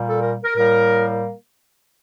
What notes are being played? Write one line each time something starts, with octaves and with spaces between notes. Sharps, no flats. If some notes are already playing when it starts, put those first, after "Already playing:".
Already playing: A#2 G3 A#3
A4
A#4
A#4
A2 G3 A#3 A#4